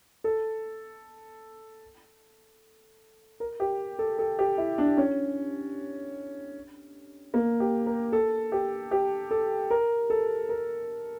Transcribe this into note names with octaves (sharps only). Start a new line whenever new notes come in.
A4
A#4
G4
A4
A4
G4
E4
D4
C#4
A#3
G4
A#4
A4
G4
G4
A4
A#4
A4
A#4